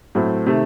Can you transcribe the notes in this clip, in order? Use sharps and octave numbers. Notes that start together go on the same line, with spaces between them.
A2 F#3 A3 C4
C3 D#3 A3